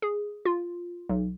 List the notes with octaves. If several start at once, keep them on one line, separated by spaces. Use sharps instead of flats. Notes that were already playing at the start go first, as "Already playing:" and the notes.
G#4
F4
B1